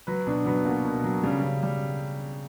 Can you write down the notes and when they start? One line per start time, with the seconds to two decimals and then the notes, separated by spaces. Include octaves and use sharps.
0.07 F#3 B4
0.27 B2 D4
0.45 F#3 B3
0.65 B2 A#3
0.84 B2
1.04 F#3
1.23 C#3 G3
1.43 C#3
1.63 G3